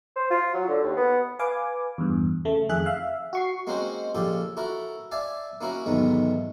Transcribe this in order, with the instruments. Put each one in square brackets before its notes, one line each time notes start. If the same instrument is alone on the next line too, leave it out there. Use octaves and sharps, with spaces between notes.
[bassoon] C5
F4
F#3
D3
D#2
B3
[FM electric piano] B4 F5 G#5 D6
E2 G2
C#3 A3
F2 D#3 G#4 E5 F#6
E5 F5
F#4 C#6 C7
[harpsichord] G#3 A#3 C4 C#4 F#4 C5
A#2 C#3 F3 G4 A4
E4 F#4 A4 A#4
D5 E5 F5 G#5 A5
A#3 C#4 E4 F#4 A#4
B1 E2 G#2 D#3 A3 B3